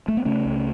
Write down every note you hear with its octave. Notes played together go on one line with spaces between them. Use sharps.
A3
B3
C#3 A3 C#4
C#2